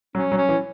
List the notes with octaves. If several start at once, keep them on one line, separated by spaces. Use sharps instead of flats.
F#3 C#4
F#3
C#4
E3